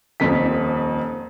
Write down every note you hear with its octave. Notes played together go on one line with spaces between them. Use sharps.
D#1 F2 D#3 C4 D#4 B6